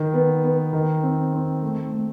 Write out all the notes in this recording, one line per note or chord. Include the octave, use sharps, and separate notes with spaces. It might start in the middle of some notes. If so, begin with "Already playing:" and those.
Already playing: D#3
B3
B3
D#3
C4
C4
A3
A3